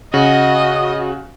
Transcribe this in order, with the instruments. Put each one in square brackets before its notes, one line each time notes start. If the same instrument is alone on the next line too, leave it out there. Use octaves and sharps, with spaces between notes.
[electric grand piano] C#3 [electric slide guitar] F#4 [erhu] D#5